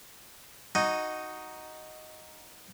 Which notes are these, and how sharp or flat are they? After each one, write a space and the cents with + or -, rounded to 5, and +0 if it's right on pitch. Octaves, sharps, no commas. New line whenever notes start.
D#4 +0 F#4 +0 G#5 -5